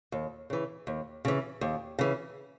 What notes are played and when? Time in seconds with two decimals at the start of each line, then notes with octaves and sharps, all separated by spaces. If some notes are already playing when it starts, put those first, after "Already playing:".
0.12 D#2
0.50 C#3 E3
0.87 D#2
1.25 C#3 E3
1.61 D#2
1.99 C#3 E3